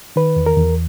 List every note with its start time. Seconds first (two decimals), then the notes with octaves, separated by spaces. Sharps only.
0.16 D#3 B4
0.36 E2
0.46 A#4
0.57 E2